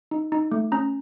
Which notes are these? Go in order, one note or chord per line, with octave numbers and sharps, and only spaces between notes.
D#4
D#4
A3
C#4 A#5